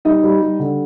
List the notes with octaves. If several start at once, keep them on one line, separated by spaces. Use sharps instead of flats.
G3 D#4 D#5
G3
G3
D3